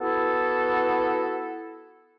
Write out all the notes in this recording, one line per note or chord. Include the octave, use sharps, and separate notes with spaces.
B3 E4 F#4 A4